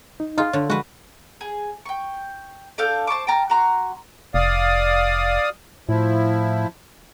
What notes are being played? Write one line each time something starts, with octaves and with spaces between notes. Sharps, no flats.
D#4
D#4 F4 G#4 D#5
D3 C#5
F3 G#3 F#4 B4
G#4
G5 C#6
D4 A4 F5 G6
C5 A5 C#6 D6
G5 A5 A#5 F6
F#4 A#5 C6
F1 D5 F5 D#6
A2 F3 E4